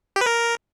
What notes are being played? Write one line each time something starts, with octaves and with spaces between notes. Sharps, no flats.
G4
B4
A#4